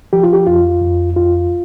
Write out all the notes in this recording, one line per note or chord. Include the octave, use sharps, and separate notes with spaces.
F3 G4
F4
G4
F2 F4
F2
F2 F4